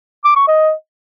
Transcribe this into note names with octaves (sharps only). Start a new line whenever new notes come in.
D6
C#6
D#5